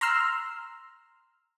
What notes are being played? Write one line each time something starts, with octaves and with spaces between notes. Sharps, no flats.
A#5 C6 E6 F6